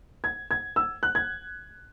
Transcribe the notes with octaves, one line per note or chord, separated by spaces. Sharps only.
G#6
G#6
E6
F#6
G#6